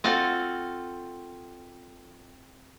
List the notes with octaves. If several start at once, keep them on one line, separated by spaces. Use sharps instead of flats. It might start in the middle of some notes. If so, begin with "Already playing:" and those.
C4 F4 F#4 A4